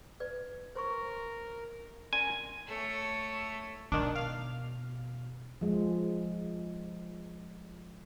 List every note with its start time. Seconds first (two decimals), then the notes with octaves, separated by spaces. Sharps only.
0.20 B4 D5
0.75 A#4 C5 C6 C#6
2.13 C#4 A#4 D5 G#5 C6
2.67 A3 C#5
3.92 B2 D#3 D4
4.15 F5
5.61 F3 G#3